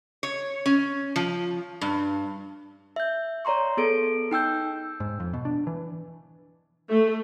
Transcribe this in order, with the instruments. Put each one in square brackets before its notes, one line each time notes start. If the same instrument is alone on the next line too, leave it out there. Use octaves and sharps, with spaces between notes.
[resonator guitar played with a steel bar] C#5
C#4
F3
G2
[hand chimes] E5 G6
C#5 D5 A#5 C6 C#6
B3 G#4 A4 D7
D#4 G5 E6 G6
[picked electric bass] G#2
F2
B2
D4
E3
[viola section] A3